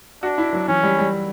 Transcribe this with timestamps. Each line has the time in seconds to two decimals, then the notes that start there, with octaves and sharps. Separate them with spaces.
0.23 D4 F#4
0.38 E4
0.53 F#3
0.68 E3 C#4
0.83 G3
0.99 G3